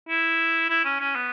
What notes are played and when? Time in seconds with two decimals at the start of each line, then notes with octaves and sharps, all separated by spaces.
0.09 E4
0.70 E4
0.85 C#4
1.00 C#4
1.16 B3